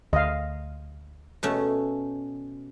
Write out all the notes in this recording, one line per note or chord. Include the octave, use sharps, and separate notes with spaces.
D2 D#5 F5
B2 A3 C#4